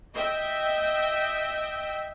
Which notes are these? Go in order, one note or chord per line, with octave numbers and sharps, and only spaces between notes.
D#5 E5 G5